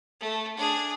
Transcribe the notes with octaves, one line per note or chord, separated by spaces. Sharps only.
A3
D4 G#4